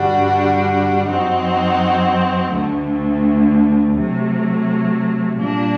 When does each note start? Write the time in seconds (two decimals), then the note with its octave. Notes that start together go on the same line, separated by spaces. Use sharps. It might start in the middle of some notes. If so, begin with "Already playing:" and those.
Already playing: G2 D3 G3 D4 F#4
1.08 F#2 F#3 C4 D#4 F#4
2.52 D2 D3 A3
3.96 C3 F#3 A3
5.40 A#2 G3 D4